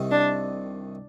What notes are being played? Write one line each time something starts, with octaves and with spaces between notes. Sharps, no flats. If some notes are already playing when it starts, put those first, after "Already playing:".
Already playing: C2 C3 D#3
D4